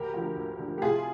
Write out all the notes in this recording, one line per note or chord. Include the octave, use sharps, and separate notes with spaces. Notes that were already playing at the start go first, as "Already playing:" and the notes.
Already playing: D2 G4 A#4
D3 F3
D2
D3 F3
G4
C2 F4 G#4